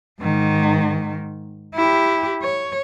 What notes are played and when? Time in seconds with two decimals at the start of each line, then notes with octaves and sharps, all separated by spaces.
0.21 G#2 D#3
1.75 E4 G4
2.42 C#5